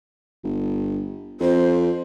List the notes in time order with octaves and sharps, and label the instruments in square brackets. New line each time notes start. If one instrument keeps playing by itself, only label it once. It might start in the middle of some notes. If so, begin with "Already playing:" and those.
[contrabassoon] G1
[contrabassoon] F2 [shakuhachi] C5